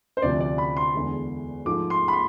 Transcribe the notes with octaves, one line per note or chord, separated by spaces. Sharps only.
C5
D2 C3 F3 D5
D5
B5
C6
E2 D3 G#3
G#2 F3 A3 D6
C6
B5
C6